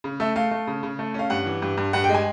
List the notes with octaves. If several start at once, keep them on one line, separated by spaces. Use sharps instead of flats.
C#3
A3 E5
A3 F5
A3
C#3
C#3
A3
C#4 F5
G2 F#5
E3
G2
G2
G2 F#5
G5
G#3
G#5